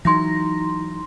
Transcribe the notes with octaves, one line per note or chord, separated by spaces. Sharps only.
E3 F#3 D#4 C6 A#6